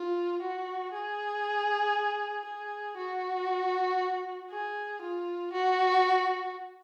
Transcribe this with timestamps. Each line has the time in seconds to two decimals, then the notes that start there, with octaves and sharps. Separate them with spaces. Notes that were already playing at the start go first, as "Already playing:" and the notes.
Already playing: F4
0.42 F#4
0.93 G#4
2.46 G#4
2.97 F#4
4.51 G#4
5.02 F4
5.53 F#4